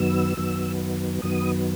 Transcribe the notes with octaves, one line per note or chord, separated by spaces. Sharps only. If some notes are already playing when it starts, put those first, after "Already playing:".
Already playing: F#2 D#3 F#3 B3 E6
F#2 D#3 F#3 B3
F#2 D#3 F#3 B3 D#6